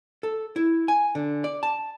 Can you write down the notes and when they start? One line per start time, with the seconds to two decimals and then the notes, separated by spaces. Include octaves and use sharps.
0.23 A4
0.56 E4
0.88 G#5
1.15 D3
1.44 D5
1.63 A5